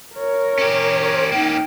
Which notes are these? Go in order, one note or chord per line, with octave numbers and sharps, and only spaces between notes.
A#4 C#5
C#4 G4
A#3 C#4 D#4 G5